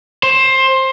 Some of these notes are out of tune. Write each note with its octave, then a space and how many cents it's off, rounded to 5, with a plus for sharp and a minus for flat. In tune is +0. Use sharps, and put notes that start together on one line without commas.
C5 +15